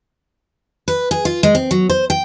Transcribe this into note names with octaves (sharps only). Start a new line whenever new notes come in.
B4
G#4
F4
G#3
C4
F#3
C5
G5